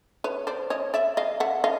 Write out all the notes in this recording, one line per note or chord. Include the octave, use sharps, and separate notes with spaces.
B4 C#5
C5 D5
C#5 D#5
D5 E5
D#5 F5
E5 F#5
D#5 F5